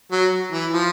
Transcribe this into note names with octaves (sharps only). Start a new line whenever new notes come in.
F#3
E3
F3